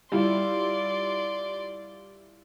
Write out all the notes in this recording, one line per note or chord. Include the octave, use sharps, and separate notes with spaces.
G3 E4 F4 D5 C6